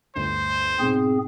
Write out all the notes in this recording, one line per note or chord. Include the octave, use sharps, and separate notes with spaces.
G1 D2 C5
G#2 B2 C4 G#4